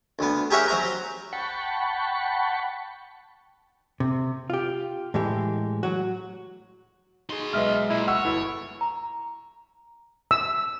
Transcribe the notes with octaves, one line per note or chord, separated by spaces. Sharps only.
D2 B3
G4 G#4 A#4 C#5 E5 F#5
F#3 C5 A#5
F#5 G5 A5 B5 C#6
C3
F4 G4
A2 E3 G#3 G4
F#3 F#4
D#4 F#4 G#4 C6
B1 G#3 B4 D#5 E5 F6
A#2 E4
F#4 C#5 E6
G1 E3 E4 A4
A#5
E6